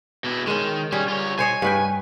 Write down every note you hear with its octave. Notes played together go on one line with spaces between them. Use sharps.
B2 E4
D#3 G#3 C#4
G3 C#4 G#4
F4 C#5
C5 C#5 D#5 G#5
G2 B4 G5